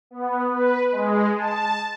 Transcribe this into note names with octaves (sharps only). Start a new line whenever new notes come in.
B3
B4
G#3
A5